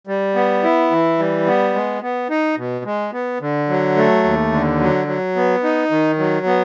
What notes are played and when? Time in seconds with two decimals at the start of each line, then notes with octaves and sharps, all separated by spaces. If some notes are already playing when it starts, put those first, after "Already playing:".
0.07 G3
0.35 B3
0.63 E4
0.91 E3
1.19 G3
1.46 B3
1.74 G#3
2.02 B3
2.30 D#4
2.58 B2
2.85 G#3
3.13 B3
3.41 D3
3.69 F#3
3.96 A3
4.24 D#2
4.52 D3
4.80 F#3
5.08 F#3
5.36 B3
5.63 D#4
5.91 D#3
6.19 F#3
6.46 B3